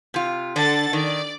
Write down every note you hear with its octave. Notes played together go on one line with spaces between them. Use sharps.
C3 F4
D3 D4 A4 F#5 A6
D#3 D5